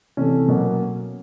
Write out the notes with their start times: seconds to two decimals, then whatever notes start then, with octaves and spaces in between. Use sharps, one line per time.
0.17 C3 E3 A3 C#4
0.48 B2 F#3 A#3